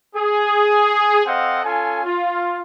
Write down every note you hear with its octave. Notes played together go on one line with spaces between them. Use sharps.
G#4
C4 A4 C5 D#5 F5 F#5
C#4 F4 A4 G#5
F4